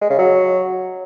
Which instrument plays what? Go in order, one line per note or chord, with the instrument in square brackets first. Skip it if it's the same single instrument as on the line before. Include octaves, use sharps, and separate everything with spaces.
[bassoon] G#3
C#3
F#3